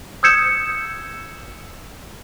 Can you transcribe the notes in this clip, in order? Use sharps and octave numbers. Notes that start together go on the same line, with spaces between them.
D#6 E6 G6 G#6 C#7 E7